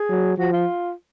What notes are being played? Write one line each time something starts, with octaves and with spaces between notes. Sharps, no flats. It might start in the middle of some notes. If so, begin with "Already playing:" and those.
Already playing: G#4
F#3
F3 F#4
F4